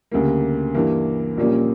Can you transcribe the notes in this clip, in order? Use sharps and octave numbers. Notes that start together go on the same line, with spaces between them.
D2 C#3 G3 A#3
G2 E3 A#3
A#1 A#2 G3 A#3 C#4